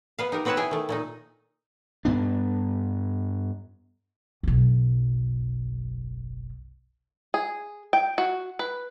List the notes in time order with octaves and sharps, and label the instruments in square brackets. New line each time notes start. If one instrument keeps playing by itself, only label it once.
[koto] B3 B4 F5
D#4 G4 A#4
B3 C4 F#4 B4 C#5 A5
E4 G#4 G5 G#5
D#3 A3
A#2 A3 D#4
[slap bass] G2 B3 D4
[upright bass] F#1 B1
[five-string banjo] G#4
G5
F#4
B4